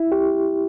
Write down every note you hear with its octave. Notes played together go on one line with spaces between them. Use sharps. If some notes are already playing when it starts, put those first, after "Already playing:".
Already playing: E4
G4